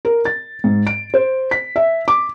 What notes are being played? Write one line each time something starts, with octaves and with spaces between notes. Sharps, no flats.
A#4
A6
G#2
D7
C5
B6
E5
D6